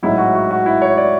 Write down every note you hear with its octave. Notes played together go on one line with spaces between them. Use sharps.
A1 G#2 F#3 E4
F#4
F#4
F#4
E4
C#5
D5